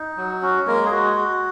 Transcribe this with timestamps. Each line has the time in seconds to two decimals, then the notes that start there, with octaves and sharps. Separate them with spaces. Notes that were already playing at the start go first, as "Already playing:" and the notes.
Already playing: D#4
0.17 F#3
0.42 C#4 F#4
0.67 G#3 A#3 A#4
0.86 G#4
0.92 G#3 F#4
1.16 F#4